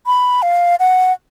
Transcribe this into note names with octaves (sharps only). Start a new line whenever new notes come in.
B5
F5
F#5